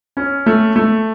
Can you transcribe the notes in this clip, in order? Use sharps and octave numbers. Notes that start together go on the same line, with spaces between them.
C#4
A3
A3